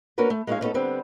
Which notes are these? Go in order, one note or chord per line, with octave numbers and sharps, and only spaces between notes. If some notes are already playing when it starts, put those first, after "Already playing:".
A#3 C#4 D4 F#4 A#4 B4
A3
G#3 B3 C#4 D#4 C#5 F5
D3 A3 B3 C#4 D#4 A4
D3 G3 B3 C4